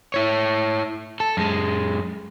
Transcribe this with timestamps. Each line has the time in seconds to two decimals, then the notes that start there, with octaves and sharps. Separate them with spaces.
0.14 E4 C#5
1.20 A4
1.37 F#2 G#3